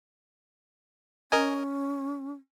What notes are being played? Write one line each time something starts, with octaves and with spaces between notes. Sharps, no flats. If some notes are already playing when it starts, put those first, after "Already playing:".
C#4 A#4 D#5 G#5